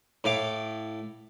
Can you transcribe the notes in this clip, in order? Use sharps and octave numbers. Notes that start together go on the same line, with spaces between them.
A2 F5 D6